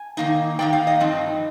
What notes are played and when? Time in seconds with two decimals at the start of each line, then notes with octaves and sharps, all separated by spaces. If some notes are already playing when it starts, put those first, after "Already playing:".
Already playing: G#5
0.17 D#3 A#3 D#4
0.59 D#3 A#3 D#4 G5
0.73 F5
0.87 D#5
1.00 G2 F3 C4 D#4